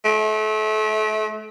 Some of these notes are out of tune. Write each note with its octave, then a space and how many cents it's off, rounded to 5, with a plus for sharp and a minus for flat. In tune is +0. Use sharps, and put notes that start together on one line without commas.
A3 -35